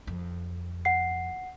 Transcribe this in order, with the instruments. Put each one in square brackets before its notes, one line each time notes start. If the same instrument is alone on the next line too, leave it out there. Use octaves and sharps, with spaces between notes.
[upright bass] F2
[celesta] F#5 C7